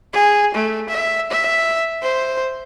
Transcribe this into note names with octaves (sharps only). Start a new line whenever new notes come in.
G#4
A3
E5
E5
C5